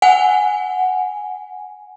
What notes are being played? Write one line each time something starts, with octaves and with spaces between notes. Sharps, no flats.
F#5 G#5